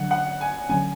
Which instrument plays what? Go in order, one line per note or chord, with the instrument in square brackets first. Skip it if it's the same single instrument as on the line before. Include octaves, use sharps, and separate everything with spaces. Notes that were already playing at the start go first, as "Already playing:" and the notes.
Already playing: [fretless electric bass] D3 F#3 D4 [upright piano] F#5
[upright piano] F#5
G#5
[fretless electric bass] D3 F#3 A3 C#4 [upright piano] G#5